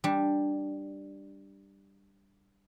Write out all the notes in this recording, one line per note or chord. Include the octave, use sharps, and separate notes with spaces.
G3 D4